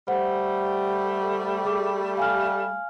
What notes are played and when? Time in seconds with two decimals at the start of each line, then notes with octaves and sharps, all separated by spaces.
0.08 G3 A3 C5 F#5
1.65 G#4 D6
2.17 F5 G#5 F6